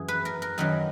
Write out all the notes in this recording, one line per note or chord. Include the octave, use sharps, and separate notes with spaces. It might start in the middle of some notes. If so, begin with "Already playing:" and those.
Already playing: F#2 E3 G#4
B4
A#4
A#4
F#2 D#3 F#3 B4